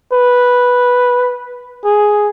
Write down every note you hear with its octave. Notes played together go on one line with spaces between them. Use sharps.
B4
G#4